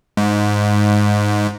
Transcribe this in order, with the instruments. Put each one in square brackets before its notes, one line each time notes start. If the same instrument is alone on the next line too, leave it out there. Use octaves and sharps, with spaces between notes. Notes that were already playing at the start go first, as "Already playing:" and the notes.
[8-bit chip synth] G#2